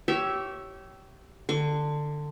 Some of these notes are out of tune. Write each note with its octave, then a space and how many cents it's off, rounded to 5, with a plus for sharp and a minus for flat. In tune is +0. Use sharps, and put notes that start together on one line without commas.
G4 -25 C#5 +0 E5 +0
D3 +15 C#6 +35